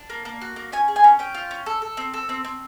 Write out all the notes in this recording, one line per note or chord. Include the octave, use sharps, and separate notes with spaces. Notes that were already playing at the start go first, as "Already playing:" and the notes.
Already playing: D4
A#3
A#3
F#4
A#3
C#4 G#5
G#4
G#5
C#4
C#4 G5
F4
C#4
A4
A4
C4
A4
C4
C4